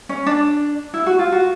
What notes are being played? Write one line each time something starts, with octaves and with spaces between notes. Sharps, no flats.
C#4
D4
E4
F#4
F4
F#4